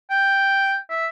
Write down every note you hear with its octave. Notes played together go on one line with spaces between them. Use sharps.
G5
E5